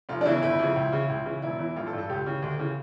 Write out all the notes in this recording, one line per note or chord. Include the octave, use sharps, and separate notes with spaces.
F1 F4
D4
E2 C#3 E3 E4
G1 E4
F2 C#3
C#2
C#3 E3
C#2
C#3 E3
E1 E4
E2 E3 E4
A1 F4
A4
G2 E3
A4
C#2 G4
C#3 E3
D2
C#3 E3